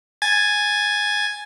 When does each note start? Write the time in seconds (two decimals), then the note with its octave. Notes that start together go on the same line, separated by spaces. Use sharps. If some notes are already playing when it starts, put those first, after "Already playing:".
0.22 G#5 G#6 A6